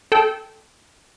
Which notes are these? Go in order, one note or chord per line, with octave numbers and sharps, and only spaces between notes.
A4 G5